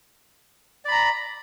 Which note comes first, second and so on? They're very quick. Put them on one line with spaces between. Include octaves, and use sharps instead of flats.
D5 B5 A#5